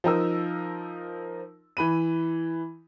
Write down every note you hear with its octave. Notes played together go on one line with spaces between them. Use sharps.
F3 D#4 A#4 E6
E3 B5 D#7